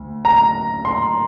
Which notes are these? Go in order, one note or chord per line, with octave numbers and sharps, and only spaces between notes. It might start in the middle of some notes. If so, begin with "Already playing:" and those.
Already playing: D2
A#5
C6